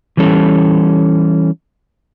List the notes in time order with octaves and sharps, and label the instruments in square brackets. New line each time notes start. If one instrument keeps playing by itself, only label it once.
[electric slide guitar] E3 G3 C#4 A4